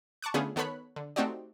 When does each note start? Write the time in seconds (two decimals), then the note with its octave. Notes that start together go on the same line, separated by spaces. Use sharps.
0.22 A5 C#6 D6 F#6
0.34 D3 A3 B3 C#4 F4 G#4
0.56 D#3 B3 A4 C#5 B5 F#6
0.96 D3
1.16 A3 C4 D#4 F#4 G4 D5